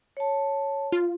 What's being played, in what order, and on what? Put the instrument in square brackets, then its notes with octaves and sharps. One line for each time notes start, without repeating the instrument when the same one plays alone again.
[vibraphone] C#5 A5
[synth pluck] F4